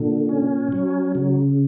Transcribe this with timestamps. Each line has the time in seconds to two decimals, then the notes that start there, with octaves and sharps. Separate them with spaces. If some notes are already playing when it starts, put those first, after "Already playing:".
Already playing: A#2 D3
0.29 C#4
0.72 F#3
1.15 C#3